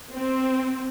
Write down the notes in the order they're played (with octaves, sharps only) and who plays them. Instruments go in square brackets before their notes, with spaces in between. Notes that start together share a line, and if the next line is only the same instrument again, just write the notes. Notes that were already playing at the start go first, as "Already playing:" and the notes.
[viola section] C4